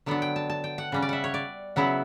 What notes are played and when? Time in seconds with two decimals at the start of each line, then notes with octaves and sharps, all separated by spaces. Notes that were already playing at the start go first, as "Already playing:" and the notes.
0.06 D3 F#3 B3 D4 F#5
0.22 G5
0.36 A5
0.50 A5
0.64 G5
0.78 F#5
0.92 C#3 G3 C#4
1.02 D5
1.09 E5 F#5
1.24 C#5
1.34 D5
1.76 C#3 F#3 B3 E4 F#5